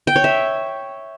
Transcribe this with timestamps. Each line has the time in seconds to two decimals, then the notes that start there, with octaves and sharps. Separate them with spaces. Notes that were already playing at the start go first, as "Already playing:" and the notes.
0.07 G5
0.16 C#5
0.24 E5